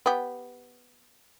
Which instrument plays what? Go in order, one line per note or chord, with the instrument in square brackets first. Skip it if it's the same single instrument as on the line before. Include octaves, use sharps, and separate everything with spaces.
[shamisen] B3 G4